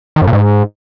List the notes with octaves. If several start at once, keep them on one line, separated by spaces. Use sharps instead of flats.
D#3
F#2
A#2
G#2